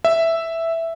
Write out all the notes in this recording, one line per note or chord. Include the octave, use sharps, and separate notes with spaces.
E5